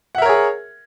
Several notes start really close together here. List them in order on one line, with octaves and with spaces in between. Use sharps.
F#5 E5 A#4 C#5 G#4